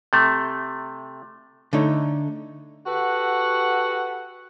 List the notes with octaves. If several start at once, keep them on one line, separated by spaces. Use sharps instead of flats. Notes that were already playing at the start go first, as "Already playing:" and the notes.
C3 A3
D3 A3 D#4 C#5
F#4 G4 A4 B4 F#5